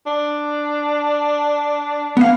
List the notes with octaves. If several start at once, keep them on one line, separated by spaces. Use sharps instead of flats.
D4
B3 F5